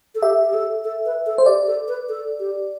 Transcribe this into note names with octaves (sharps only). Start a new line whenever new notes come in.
A4
G4 E5
G4
A4
A4
B4
A4
C5
G4 D5
A4
B4
A4
G4